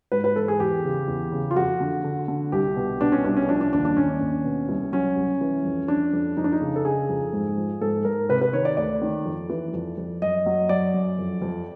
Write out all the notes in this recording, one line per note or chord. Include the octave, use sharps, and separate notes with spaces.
G#2 B4
B4
E3 A4
G#4
E2 G4
C#3
E2
C#3
F4
F2 F#4
D3
D3
D3
C2 G4
B2
B2 D4
C#4
C2 D4
C#4
F3 D4
D4
D#2 D4
D4
D#2 C#4
D#2
B2
C2
F#3 C#4
C2
E3
F2
F2 D4
F2
F2 D#4
D4
D#4
C#3
A4
C#3 G#4
F2
G#2
F3
G#2 A4
G#2 A#4
C3 B4
B4
D#3 C#5
D5
D2 D5
D#3
F2
E3
F2
F2
F#2 D#5
F#3
F#2 D5
F#2
F2
F2